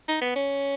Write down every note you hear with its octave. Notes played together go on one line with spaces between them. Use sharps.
D#4
B3
C#4